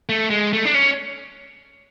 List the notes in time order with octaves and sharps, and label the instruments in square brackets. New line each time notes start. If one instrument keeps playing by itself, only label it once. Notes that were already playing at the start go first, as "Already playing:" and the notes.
[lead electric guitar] A3
G#3
A3
D4
C#4